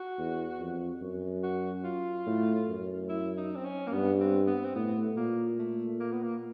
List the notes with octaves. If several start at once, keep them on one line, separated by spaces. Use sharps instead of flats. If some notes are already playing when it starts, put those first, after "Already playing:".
Already playing: F#4
E2
F2
F#2
F#4
F4
A2
F#2
E4
D#4
C4
C#4
A#3
G2 B3
C4
B3
C4
A2 B3
A#2 A#3
A3
A#3
B3
A#3